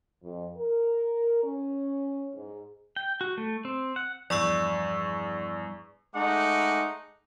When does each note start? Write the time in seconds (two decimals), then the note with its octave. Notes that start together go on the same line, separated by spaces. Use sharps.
0.22 F2
0.57 A#4
1.44 C#4
2.34 G#2
2.96 G5
3.21 F#4
3.38 A3
3.65 C4
3.96 F#5
4.30 E2 G2 F3 D5 C#6 E6
6.15 G#3 A3 D#4 F#5 D6